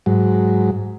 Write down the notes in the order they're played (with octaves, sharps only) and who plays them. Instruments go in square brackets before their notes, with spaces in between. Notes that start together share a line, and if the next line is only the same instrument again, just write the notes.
[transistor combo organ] G#2 F#3